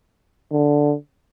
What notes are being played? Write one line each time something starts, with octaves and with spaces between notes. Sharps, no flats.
D3